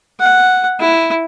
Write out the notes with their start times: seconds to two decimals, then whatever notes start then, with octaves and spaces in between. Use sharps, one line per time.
0.19 F#5
0.80 E4